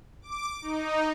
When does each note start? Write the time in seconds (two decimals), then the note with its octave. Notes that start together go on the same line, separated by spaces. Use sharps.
0.22 D6
0.62 D#4